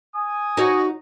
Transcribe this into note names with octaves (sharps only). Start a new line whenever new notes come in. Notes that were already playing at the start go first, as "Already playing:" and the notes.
G#5 D#6
D#4 F#4 C#5